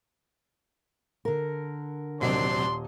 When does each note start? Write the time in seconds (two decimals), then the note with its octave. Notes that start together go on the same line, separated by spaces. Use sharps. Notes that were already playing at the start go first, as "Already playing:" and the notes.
1.25 D3 A#4
2.21 D#1 C3 F#3 C4 D4 D#5 C6